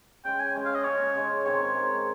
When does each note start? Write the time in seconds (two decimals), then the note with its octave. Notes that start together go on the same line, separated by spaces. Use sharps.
0.25 C#3 G#3 C#4 G5
0.40 G#5
0.55 C#3 G#3 C#4
0.65 F5
0.75 D#5
0.84 C#3 G#3 C#4 C#5
1.15 C#3 G#3 C#4
1.45 G#2 D#3 G#3 C4 C#5
1.75 G#2 D#3 G#3 C4